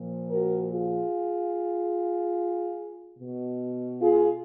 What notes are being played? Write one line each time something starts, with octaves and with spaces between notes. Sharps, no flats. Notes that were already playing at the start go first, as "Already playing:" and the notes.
Already playing: A#2 F3
F#4 A#4
F4 G#4
B2
F4 G#4